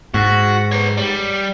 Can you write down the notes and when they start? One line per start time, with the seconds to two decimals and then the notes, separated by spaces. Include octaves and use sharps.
0.14 G#2 F#4
0.72 B4 C#5
0.97 G3